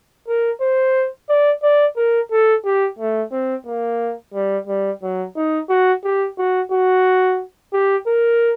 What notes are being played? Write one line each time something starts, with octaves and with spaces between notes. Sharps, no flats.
A#4
C5
D5
D5
A#4
A4
G4
A3
C4
A#3
G3
G3
F#3
D#4
F#4
G4
F#4
F#4
G4
A#4